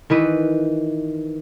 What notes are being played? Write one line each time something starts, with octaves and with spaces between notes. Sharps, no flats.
D#3 E3 B4